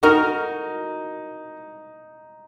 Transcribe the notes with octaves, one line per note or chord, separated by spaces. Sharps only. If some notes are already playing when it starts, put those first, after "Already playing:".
D#4 F#4 A#4